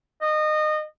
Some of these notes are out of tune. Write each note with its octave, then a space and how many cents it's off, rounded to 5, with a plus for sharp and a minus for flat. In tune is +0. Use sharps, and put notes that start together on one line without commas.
D#5 -25